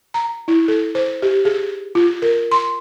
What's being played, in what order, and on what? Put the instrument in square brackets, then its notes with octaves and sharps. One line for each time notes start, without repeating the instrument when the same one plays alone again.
[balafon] A#5
E4
A4
C5
G4
G#4
F4
A#4
C6